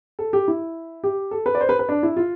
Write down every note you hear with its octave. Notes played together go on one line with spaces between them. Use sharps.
A4
G4
E4
G4
A4
B4
D5
C5
B4
B4
D4
E4
F4